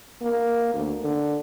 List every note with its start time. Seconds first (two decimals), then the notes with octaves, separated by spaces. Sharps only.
0.22 A#3
0.74 D2
1.04 D3